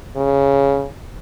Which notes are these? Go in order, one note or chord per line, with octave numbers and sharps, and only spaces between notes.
C#3